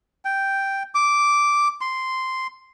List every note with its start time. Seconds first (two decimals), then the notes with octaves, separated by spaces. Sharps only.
0.25 G5
0.95 D6
1.81 C6